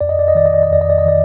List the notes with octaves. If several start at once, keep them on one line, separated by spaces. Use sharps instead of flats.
F2 D5
D#5
D5
D#5
D#3 D5
D#5
D5
D#5
F2 D5
D#5
D5
D#5
D#3 D5